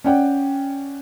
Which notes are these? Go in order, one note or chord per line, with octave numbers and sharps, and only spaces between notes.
C#4 D5 F#5 G5